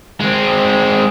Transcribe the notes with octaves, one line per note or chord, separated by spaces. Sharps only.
G#3 C4